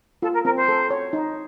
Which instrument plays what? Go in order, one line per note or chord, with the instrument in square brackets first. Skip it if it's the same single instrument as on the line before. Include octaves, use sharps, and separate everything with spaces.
[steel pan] F4 [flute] A4
[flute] A#4
[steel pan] C4 [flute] A#4
[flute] C5
[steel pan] A4
C#5
D#4